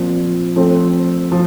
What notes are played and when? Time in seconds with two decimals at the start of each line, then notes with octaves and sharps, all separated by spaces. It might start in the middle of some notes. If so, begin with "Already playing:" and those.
Already playing: A#2 F3 C4
0.56 F3 A3 C4
1.32 F3